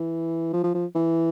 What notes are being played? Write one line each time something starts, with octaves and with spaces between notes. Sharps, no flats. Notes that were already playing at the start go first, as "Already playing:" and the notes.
Already playing: E3
F3
F3
F3
E3